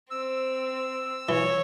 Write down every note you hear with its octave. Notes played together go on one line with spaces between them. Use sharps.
C4 E6
E3 C#5